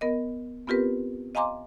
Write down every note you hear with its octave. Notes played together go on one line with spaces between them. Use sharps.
B3 A#4 D#5
B3 C4 F4 G4 A#4 B4
D#5 F5 G#5 A#5 C6 D6